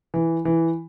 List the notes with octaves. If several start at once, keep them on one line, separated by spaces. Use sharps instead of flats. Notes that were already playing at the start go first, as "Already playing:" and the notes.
E3
E3